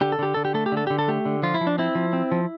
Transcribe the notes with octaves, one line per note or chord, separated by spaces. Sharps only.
D3 G4
A4
D3 G4
D3 A4
G4
A3 A4
G4
D3
A4
D3 G4
A4
A3 G4
D3
F3 F4
E4
F3
D4
C4 E4
F3
C4
F3